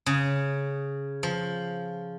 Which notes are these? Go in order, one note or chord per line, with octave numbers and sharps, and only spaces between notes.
C#3
F3